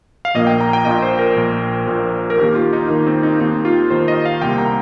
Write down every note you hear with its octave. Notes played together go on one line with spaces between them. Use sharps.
F5
A#1 A#2 A#3 D#5
G5
A#5
G5
A#1 A#2 A#3 D#5
C5
A#4
A#1 A#2 A#3
A#1 A#2 A#3
A#4
D#2 D#3 A#3 G4
F4
D#4
D#2 D#3 A#3
C4
D#4
D#2 D#3 A#3 D#4
F4
D#2 D#3 A#3 C5
D#5
F5
C2 C3 G3 A#3 G5
A#5